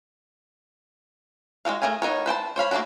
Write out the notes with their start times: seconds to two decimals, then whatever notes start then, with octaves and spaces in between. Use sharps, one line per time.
1.65 G#3 C4 F#4 F5
1.82 A3 G#4 A#4 F5 G#5
2.02 B3 D#4 A#4 C#5
2.26 B4 C5 G5 A5
2.56 C5 C#5 F5 B5
2.71 A3 A#3 C4 D4 F#4